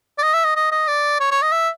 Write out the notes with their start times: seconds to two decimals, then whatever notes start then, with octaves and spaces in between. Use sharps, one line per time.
0.18 D5
0.22 D#5
0.33 E5
0.44 D#5
0.56 D#5
0.71 D#5
0.87 D5
1.20 C#5
1.31 C#5
1.42 D#5
1.52 E5